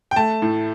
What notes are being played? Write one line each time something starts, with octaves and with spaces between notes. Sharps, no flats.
G5
A3 A5
A2